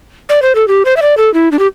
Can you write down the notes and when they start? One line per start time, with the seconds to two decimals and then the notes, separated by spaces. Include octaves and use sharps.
0.29 D5
0.42 C5
0.55 A4
0.68 G4
0.85 C5
0.96 E5
1.02 D5
1.17 A4
1.34 E4
1.52 D4
1.59 G4